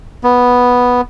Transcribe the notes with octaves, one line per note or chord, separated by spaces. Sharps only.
B3